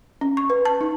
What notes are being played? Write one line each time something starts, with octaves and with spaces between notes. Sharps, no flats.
C#4
C#6
B4
A5
D#4